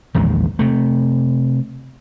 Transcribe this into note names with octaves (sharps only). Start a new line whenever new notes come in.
A#1 E2 D#3 G#3
C3 A3